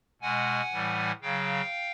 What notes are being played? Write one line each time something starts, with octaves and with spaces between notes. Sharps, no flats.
B2 G#3 F#5 G#5
A2 E3 G3
C#3 F#3 F5 G5